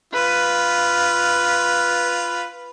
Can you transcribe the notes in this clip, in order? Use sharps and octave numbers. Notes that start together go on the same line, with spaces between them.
F4 B4